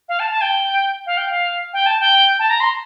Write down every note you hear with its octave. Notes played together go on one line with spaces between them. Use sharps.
F5
A5
A5
G5
F5
G5
F5
G5
A5
G5
A5
A#5
C6